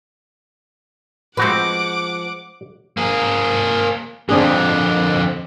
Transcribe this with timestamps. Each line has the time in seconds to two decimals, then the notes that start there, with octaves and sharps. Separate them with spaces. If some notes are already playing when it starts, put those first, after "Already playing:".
1.37 F3 G#3 C4 F#4 B4 F#5 D6
2.97 A#3 G#4
4.29 F2 D3 C4 D4 G#4